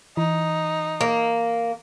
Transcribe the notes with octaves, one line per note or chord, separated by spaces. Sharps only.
E3 D#4
A#3